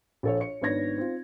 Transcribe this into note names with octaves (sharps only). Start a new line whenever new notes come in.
A#1 A4 C#5
C#5 C#7
G#1 B3 D4 C#5 G#6 A#6
C4 F4